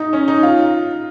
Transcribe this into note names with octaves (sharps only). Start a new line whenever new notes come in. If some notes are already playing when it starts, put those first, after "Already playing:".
Already playing: D#4
C#4
D#4
F4